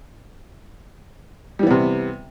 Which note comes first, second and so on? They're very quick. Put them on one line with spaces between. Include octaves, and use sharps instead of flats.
G3 E3 B3 C3